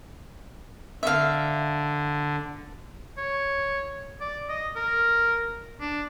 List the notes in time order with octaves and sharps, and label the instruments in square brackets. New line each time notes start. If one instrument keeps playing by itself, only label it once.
[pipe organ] D3 [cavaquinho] E5 F5
[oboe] C#5
D5
D#5
A#4
D4